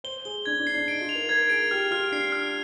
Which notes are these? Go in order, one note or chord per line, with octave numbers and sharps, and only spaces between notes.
C5 G7
G#4 G7
D4 G#6
D4
C7
D4
D#4 D7
F4
F7
A#4
A#4 G#6
G#4 D7
G4 F6
F4 F6
D4 C7
F6